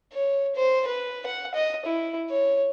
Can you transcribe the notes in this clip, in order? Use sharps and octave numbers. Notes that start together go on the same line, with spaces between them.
C#5
C5
B4
F#5
D#5
E4
C#5